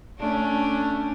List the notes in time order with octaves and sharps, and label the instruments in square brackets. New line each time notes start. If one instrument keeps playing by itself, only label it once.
[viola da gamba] A3 C#4 D4